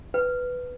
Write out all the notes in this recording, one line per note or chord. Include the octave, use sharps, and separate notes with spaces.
B4